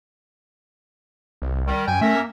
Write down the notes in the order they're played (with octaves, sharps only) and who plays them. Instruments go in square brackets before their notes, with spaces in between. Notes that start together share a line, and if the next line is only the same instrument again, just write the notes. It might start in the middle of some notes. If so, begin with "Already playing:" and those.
[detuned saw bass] C2
[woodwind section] D#3 G3
[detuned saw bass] F#2 [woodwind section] G5 G#5
[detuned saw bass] A3 [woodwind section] C#4 A#4 E5
[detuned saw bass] A#3